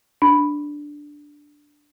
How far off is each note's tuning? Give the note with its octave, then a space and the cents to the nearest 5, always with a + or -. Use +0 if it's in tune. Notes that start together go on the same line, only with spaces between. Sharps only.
D4 +0 B5 +0